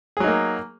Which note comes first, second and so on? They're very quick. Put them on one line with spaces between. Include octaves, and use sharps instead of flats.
G#4 F#3 D#4 A#3